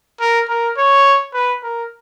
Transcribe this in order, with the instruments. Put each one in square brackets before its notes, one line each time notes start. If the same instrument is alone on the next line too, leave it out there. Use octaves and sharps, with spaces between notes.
[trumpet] A#4
A#4
C#5
B4
A#4